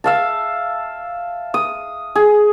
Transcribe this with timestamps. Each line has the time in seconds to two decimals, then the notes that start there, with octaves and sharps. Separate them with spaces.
0.04 E5 F5 A5
1.54 D#6
2.15 G#4